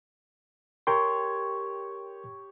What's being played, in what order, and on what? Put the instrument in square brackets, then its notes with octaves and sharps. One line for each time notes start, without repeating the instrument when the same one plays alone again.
[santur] G4 C#5 [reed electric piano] A#4 G5 C6